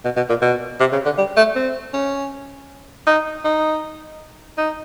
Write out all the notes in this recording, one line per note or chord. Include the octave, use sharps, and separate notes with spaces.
B2
B2
A#2
B2
C3
C#3
D3
G3
A3
C4
C#4
D#4
D#4
D#4